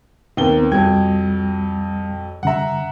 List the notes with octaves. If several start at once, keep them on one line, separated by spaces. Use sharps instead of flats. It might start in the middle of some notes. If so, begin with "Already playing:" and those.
D#2 B3 C4 A#4 G7
C2 F2 F#3 G3 G5 G#6
G2 C#3 E5 F#5 A#5